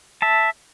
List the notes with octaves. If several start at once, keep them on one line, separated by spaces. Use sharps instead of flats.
E5 A5